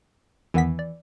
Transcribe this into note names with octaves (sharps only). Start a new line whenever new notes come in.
E2 D#3 E3 B3 B6
D5